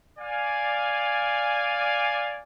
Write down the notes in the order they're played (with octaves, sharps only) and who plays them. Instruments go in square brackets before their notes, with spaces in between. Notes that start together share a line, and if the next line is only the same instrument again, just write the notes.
[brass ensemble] D5 F5 G#5